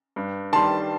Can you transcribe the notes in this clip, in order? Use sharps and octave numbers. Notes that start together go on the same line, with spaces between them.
G2
D#3 G3 A5 C6